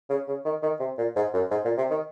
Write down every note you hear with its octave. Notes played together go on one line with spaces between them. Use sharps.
C#3
C#3
D#3
D#3
C3
A#2
G#2
F#2
G#2
A#2
C3
D#3